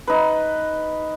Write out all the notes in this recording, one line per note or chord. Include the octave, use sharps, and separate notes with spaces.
D#4 B4